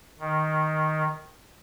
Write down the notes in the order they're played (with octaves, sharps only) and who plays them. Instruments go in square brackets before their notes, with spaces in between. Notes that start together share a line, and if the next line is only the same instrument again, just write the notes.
[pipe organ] D#3